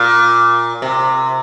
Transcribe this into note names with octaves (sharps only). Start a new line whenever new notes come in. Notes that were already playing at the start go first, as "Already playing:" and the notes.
Already playing: A#2
C3